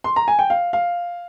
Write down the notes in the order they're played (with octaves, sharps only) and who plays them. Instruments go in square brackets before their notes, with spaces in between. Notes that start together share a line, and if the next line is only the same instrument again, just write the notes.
[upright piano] C6
A#5
G#5
G5
F5
F5